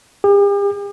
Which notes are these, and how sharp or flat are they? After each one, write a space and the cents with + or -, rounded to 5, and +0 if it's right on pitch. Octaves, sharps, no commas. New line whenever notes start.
G4 +45